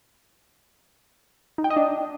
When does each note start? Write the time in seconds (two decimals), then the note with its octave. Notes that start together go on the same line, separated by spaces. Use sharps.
1.58 D#4
1.64 G5
1.70 D#5
1.76 D4